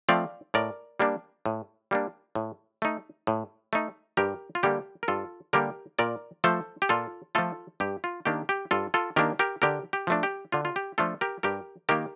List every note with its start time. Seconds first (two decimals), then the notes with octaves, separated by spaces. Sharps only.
0.09 F3 A3 C4 D5 F5
0.54 A2 A#4 D5
1.00 G3 A#3 D4
1.46 A2
1.91 G3 A#3 D4
2.35 A2
2.82 A3 D#4
3.27 A2
3.73 A3 D#4
4.17 G2 G4 A#4
4.55 F4
4.63 D3 G3 A#3 G4
5.03 A#4
5.08 G2 F4 A4
5.53 D3 G3 A#3 G4 A#4
5.99 A#2 A#4 D5
6.44 F3 A3 A4 C5
6.82 G4
6.89 A#2 F4 A4
7.35 F3 A3 F4 A4
7.80 G2 G4
8.04 F4
8.25 D#3 A#3 D4 G4
8.49 G4
8.71 G2 F4 A4
8.94 F4 A4
9.16 D#3 A#3 D4 G4 A#4
9.39 G4 A#4
9.62 D3 G4 A#4
9.93 G4
10.07 F3 A3 D4
10.23 G4
10.52 D3 F4
10.65 F4
10.76 G4
10.98 F3 A3 D4 F4 A4
11.21 G4 A#4
11.43 G2 G4 A#4
11.89 D#3 A#3 G4 A#4